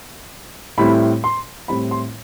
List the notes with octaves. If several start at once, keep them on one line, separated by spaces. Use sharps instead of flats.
A2 G3 C4 E4 B5
C6
A2 G3 C4 E4 B5
C6